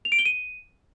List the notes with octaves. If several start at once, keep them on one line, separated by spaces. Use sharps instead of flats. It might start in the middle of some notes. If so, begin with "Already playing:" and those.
F7
D7
G7
D#7